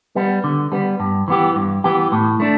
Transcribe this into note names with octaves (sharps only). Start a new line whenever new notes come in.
G3 B3
D3
G3 B3
G2
E3 B3 G4
G2
E3 B3 G4
A2
A3 D4